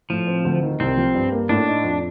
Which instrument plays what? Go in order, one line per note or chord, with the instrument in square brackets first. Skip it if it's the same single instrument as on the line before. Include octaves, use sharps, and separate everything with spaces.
[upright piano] A2 [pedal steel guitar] F3
[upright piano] C4
D2
D#3
[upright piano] C2 [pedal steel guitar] C4
[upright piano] F3
G2
A#3
[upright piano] A2 [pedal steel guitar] D4
[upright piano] D#4
F2